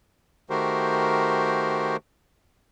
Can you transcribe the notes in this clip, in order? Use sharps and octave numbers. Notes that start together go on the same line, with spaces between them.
D#3 A3 F#4 G4 A#4 C5